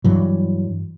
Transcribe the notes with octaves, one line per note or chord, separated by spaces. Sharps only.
G2 E3 F#3